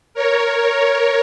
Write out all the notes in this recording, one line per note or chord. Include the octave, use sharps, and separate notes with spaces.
A#4 C#5